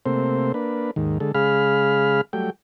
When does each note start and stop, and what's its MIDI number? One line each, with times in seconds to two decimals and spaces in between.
0.06 0.52 48
0.06 0.52 57
0.06 0.52 58
0.06 0.52 60
0.06 0.52 72
0.54 0.91 58
0.54 0.91 62
0.54 0.91 71
0.96 1.18 39
0.96 1.18 44
0.96 1.18 51
1.20 1.32 50
1.20 1.32 56
1.20 1.32 69
1.35 2.21 49
1.35 2.21 56
1.35 2.21 68
1.35 2.21 77
1.35 2.21 83
1.35 2.21 89
2.33 2.50 54
2.33 2.50 55
2.33 2.50 57
2.33 2.50 79